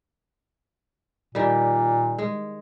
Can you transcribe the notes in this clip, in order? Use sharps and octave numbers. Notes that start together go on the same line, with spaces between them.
A#2 D#3 G3
G#3